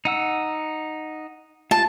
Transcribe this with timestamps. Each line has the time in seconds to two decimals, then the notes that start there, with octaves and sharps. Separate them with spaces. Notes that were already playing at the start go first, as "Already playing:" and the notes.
0.05 D#4 F#5 E6
1.71 F4 A5